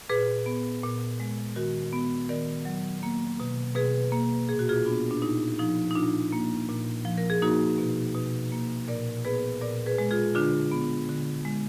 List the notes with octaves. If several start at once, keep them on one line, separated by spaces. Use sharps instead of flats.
A#2 G#4 B4
B3
A#2
G#3
D#3 F#4 A#4
B3
D#3 A#4 D5
F#3
A#3
B2
B2 G#4 B4
A#3
A#2 G#4
F#4
F4 G#4
B3 D4 F4
D4
A#2 D#4
F3 D#4
D#4
A#2 D4 F4
A#3
A#2
F3
A#4
G#4
A#3 D#4 F#4
B2
B2
A#3
A#2 A#4 D5
B3 G#4 B4
A#2 A#4 D5
G#4 B4
G#3
F4 G#4
D3 D4 F4
B3
D3
G#3